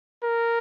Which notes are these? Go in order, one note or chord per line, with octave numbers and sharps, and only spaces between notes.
A#4